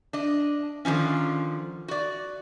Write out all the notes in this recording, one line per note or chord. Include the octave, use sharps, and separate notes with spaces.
D4 D#5
D3 D#3 F3 C#4
F#4 D5